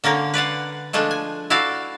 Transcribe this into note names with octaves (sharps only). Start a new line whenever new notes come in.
D3 A#3 C#4 A#4
B4 D5 F5 F#5
F3 G#3 A3 D4
G#5
E4 F#4 A4 D5 F5